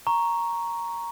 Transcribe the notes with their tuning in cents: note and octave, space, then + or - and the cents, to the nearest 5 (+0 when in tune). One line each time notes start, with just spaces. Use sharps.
A#5 +0 C#6 +0